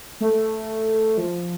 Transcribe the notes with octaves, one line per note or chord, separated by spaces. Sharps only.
A3
F3